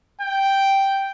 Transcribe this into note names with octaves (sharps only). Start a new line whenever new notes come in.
G5